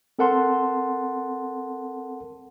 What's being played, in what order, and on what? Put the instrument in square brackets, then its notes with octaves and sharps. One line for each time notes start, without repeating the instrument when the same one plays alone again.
[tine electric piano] C4 A4 A#4 F#5 A5 C6